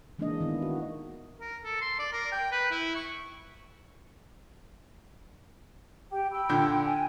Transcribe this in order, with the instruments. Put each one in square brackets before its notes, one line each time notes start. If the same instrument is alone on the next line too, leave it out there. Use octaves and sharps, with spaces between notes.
[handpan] E3 G#3 A#3 D4 D#4 D#5
D#3 B3 E4
F#4
[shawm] A#4
A4
C6
D5
A#4
G5
B4
E4
C#6
[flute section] G4
G5 B5 E6
[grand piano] A#2 D3 G6
[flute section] G5 G#5